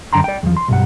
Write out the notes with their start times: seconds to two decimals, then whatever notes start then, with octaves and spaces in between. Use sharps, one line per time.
0.13 F#2 D3 G5 A#5 C6
0.24 D5 G5
0.43 E2 F3
0.57 C6
0.68 B1 G2 F#5